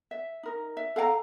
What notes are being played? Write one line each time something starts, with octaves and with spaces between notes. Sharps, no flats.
E5
D#4 A#4
E5
A4 F5 F#5 A#5